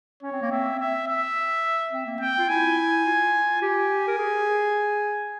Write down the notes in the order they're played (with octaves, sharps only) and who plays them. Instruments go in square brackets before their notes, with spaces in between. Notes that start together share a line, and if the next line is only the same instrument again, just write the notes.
[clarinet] C#4 [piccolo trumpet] C#5
[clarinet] C4
A#3
[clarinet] C4 [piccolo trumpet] E5
[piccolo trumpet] E5
E5
[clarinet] C4
A#3
[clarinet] C4 [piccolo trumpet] G5
[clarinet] F4
[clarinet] E4 [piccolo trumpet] G#5
[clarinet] F4
[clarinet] G4 [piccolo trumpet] G#5
[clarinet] A#4
G#4